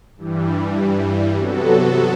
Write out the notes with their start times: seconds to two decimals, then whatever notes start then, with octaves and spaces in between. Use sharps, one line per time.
0.17 G2 E3 G3
1.37 C3 F#3 B3 F#4 A4